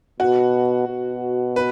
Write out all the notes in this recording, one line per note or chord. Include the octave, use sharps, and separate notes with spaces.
B2 F#4
B2
B4